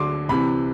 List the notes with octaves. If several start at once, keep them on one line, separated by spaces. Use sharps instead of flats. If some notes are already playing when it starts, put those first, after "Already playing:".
Already playing: D2 D3 F#3 C6 D6
C2 C3 E3 B5